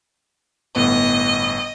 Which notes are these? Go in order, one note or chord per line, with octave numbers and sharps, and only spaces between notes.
G1 A2 B3 D#5